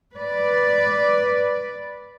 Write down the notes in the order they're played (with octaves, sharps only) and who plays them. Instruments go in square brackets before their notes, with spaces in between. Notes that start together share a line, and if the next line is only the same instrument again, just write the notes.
[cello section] B4 D5